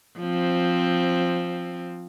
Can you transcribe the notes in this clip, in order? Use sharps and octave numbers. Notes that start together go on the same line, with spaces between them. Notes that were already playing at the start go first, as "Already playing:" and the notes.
F3 C4